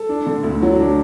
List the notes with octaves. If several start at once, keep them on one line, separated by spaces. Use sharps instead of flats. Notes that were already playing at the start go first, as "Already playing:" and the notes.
Already playing: A4
D4
D3
D2
F#3
D4